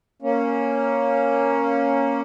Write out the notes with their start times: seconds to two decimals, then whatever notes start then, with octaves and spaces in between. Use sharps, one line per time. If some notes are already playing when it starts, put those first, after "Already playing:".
0.22 A#3 C#4